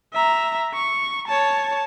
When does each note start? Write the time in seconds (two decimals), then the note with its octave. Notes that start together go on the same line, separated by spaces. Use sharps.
0.13 E5 A#5
0.75 C#6
1.28 C#5 A5